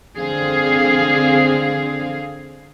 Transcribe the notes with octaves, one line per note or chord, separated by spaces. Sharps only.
D3 C4 G#4 F5